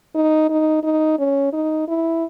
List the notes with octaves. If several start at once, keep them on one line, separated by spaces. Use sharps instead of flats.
D#4
D#4
D#4
C#4
D#4
E4